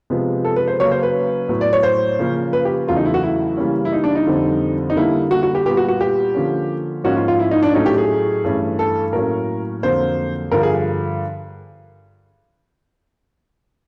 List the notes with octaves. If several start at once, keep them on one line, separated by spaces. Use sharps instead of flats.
C3 F3 G#3 B3
A4
B4
C5
C#3 F#3 A#3 C#4 C#5
C5
B4
A2 F#3 B3
D5
C#5
C5
C#3 F3 A#3 C#4
B4
G4
E2 C#3 F#3 A3 F4
D#4
E4
F#4
E4
C#3 E3 G3 A#3 C#4
E4
D#4
D4
D#4
F2 D3 G3 C4
D#4
D3 G3 A#3 E4
F#4
F#4
G4
A#2 G3 B3 G4
F#4
F#4
G4
D3 F3 A#3 C#4
G#2 F3 A#3 C#4 F#4
F4
F4
E4
D#4
D4
A2 F#3 A3 C#4 D#4
G4
G#4
G2 E3 A3 C#4
A4
A2 F#3 A#3 C#4 A#4
F2 D3 F#3 A#3 C5
G2 D3 F3 A#4
G#4